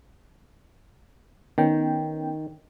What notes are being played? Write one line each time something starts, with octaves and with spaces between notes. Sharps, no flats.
D#3 B3 C#4 G5